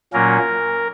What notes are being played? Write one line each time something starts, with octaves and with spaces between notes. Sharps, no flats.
A#2 F#3 A#3 C#4 A#4